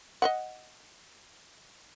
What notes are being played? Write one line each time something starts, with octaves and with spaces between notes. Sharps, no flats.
D#5 E5 F#5